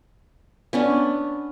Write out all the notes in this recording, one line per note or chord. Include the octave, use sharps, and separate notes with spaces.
B3 C#4 D4